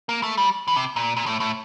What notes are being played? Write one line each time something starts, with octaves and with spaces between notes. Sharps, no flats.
A#3
A3
G3
E3
C3
A#2
A#2
A2
A2